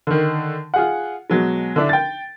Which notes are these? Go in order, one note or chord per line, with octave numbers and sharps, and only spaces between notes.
D3 D#3
F4 G#4 F#5
B2 F#3 G#3
D3 D4 E4
G5 A6